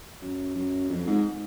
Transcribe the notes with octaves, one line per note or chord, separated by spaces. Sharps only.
F#2
F#2
F2
G#2